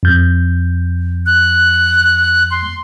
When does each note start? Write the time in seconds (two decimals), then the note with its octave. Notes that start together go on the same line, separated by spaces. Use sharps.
0.03 F2 G6
1.26 F#6
2.51 C6